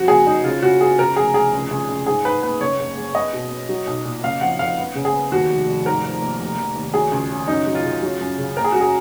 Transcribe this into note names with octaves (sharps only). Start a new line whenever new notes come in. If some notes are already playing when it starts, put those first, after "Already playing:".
Already playing: F2 F#4
F#1 G#4
G#3 D#4
C#3 F4
C#3 F#4
B3 G#4
C#3 A#4
F1 G#4
F1 G#4
C#2
C#2
C#2
G#2 G#4
G#2 B4
A#3 B4
F#1 C#5
F#1
G#3
B3 D#5
B2
B3
F#3
B1
A#2
F#1 F5
F2 F#5
F2 F5
B3
C#3
G#4
B3
D#2 F#4
F1
F1
G#2 A#4
F3
A#3
F1
F1
D#2
F#3 G#4
C#2
C#3
F#2 D#4
F#3
F4
C#3
F#3
F#2
C#3
F#1 A#4
G#4
G#3 F#4
G#4